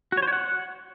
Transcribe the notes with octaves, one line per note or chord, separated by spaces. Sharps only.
F#4
C#5
C5
C#5
F#5